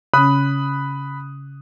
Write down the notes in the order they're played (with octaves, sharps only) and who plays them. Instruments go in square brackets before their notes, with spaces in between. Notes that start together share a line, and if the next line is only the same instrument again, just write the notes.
[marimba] C#3 C#4 [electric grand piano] B5 D#6 F#6